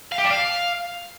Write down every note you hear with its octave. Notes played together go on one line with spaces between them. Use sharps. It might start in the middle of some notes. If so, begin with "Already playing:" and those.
F5
G4
D4
F5